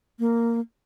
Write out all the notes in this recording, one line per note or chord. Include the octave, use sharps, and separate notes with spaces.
A#3